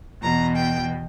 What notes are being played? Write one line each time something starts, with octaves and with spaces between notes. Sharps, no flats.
E2 B2 A#5
G5